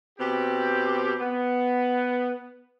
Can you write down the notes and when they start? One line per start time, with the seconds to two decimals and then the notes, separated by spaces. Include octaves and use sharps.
0.19 B2 C4 G4
1.20 B3